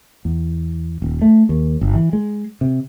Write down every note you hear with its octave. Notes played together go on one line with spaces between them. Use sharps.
E2
D#1
A3
D#2
G1
E3
G#3
C3